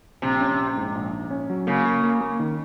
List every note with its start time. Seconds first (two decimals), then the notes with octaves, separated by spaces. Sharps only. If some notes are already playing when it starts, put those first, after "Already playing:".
0.22 A#1 C3
0.41 C#4
0.58 A#1
0.77 G#2
0.95 A#1
1.13 A#1
1.31 C#4
1.50 F#3
1.67 C#3 A#3
1.85 A#3
2.03 A#3
2.21 A#3
2.40 D#3